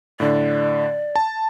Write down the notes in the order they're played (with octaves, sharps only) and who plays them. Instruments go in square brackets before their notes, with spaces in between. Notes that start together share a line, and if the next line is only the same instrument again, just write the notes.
[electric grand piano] A2 D3 [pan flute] D5
[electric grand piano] A5